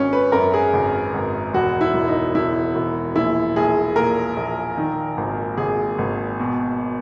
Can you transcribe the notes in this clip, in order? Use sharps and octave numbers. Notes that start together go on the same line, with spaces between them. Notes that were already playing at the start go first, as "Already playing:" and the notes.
Already playing: G#1 C#4
B4
F#2 A#4
G#4
G#1
G#1
E1 F#4
E4
E1
D#4
E1 E4
E1
A#1 E4
A#1 G#4
A#2 A#4
A#1
D#3
G#1
G#1 G#4
G#1
B2